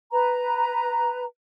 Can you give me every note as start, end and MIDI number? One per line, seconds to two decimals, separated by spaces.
0.11 1.24 71
0.11 1.24 82